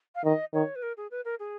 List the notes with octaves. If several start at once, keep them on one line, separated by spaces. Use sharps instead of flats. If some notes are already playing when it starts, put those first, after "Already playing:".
F5
D#3 D#5
D#3 C#5
B4
A#4
G#4
B4
A#4
G#4